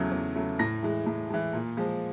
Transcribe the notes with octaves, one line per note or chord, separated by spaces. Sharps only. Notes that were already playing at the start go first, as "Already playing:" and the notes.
Already playing: E2 C#3 F#3 A3
E2
C#3 F#3 A3
A2 A#6
E3 G#3
A2
E3 G#3
A#2
F3 G#3